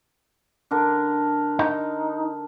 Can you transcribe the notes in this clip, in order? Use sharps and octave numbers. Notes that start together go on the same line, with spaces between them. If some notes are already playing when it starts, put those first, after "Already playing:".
D3 D4 A#4
D#4